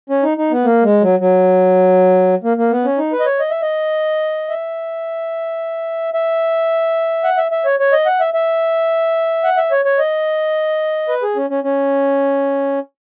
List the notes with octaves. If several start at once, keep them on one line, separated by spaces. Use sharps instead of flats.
C#4
D#4
D#4
B3
A#3
G#3
F#3
F#3
A#3
A#3
B3
C#4
D#4
B4
D#5
C#5
D#5
E5
D#5
E5
E5
F#5
E5
E5
C#5
C#5
D#5
F#5
E5
E5
F#5
E5
C#5
C#5
D#5
B4
G#4
C#4
C#4
C#4